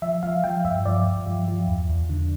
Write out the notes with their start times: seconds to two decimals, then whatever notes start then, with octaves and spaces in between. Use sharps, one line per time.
0.02 F3 E5
0.23 F3 F5
0.44 F3 G5
0.65 G2 E5
0.85 F3 D5
1.06 G2
1.27 F3
1.48 F3
1.68 E2
1.89 E2
2.09 D3